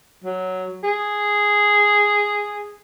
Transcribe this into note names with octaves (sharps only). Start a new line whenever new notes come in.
F#3
G#4